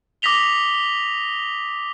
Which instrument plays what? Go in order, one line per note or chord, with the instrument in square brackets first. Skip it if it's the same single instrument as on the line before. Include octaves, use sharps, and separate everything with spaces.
[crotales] D6 D#6 A#6 B6 F7 G7